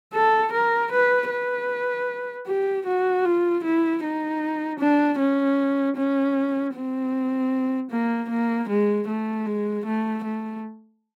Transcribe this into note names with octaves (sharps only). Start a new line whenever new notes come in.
A4
A#4
B4
B4
G4
F#4
F4
E4
D#4
D4
C#4
C#4
C4
A#3
A#3
G#3
A3
G#3
A3
A3